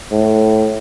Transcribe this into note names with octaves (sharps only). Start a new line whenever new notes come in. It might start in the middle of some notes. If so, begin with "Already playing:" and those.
A2